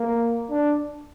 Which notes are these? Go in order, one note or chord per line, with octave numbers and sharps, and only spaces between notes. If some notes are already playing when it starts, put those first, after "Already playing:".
Already playing: A#3
D4